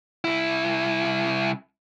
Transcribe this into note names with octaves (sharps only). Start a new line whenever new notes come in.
C2 E4